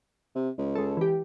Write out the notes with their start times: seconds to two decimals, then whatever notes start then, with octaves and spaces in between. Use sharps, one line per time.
0.35 C3
0.58 C#2
0.75 G#3 A4
0.97 E3 G4